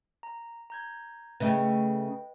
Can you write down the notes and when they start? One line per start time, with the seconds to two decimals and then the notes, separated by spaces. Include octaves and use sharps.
0.23 A#5
0.70 A#5 G6 G#6
1.40 C#3 A3 B4 D#5 G5